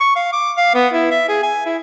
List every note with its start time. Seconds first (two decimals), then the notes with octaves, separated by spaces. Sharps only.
0.01 C#6
0.16 F5
0.33 D6
0.57 F5
0.74 B3
0.93 E4
1.11 E5
1.29 G#4
1.43 G#5
1.66 E4